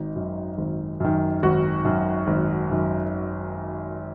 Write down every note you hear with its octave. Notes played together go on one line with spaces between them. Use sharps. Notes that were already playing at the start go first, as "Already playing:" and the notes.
Already playing: G#1 D#4
F#2 D#3
G#1
F#2 D#3
G#1 F#4
F#2 D#3
G#1
F#2 D#3